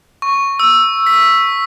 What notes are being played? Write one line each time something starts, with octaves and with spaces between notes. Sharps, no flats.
C#6
E6
B6